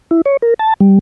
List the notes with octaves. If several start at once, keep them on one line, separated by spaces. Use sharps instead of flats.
E4
C#5
A#4
A5
G3